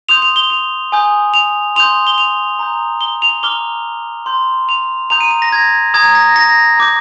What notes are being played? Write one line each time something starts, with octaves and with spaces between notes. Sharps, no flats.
C6 D#6 G6 F7
F7
G7
F7
G#5 D#6 G6
F7
C6 D#6 G6 F7
G7
F7
A#5 D#6 G6
G7
F7
A#5 D6 F6 G7
C6 G6
F7
A#5 D#6 G6 F7
D#7
D#7
A#6
G#6
A#5 D#6 G6 G#6
A#6
A#6
A#5 D6 G6